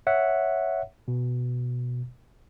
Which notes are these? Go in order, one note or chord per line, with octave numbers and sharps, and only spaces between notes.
C#5 E5 F#5
B2